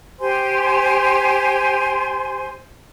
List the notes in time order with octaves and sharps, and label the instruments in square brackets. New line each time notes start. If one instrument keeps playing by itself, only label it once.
[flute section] G4 C5 G#5 C6